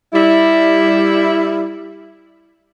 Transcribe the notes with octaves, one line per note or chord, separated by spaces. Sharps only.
G3 E4